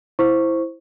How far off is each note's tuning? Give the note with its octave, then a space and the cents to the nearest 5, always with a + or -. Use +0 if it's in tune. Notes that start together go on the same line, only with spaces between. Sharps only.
E4 +0 C5 +0 C#6 +0